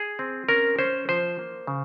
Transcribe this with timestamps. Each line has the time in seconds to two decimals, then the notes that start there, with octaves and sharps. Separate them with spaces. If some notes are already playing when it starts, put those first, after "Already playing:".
Already playing: G#4
0.19 C4
0.49 C#4 A#4
0.79 C#4 C5
1.09 F3 C5
1.39 A#3
1.67 C#3